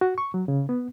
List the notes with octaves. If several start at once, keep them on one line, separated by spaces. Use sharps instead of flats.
F#4
C#6
F#3
C#3
B3